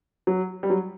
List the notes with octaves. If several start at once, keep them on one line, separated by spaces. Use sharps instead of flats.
F#3
G3
F#3